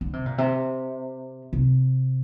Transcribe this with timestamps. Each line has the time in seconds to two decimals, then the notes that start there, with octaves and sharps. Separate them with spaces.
0.01 D3
0.13 C3
0.26 A#2
0.38 C3
1.53 C3